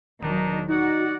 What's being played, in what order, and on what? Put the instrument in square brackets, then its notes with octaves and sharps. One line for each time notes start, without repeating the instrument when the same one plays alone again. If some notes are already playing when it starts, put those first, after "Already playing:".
[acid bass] E1 [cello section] D#3 F#3 [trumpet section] D4 D#4
[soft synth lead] D#4 [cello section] F#4 [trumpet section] D5 F#5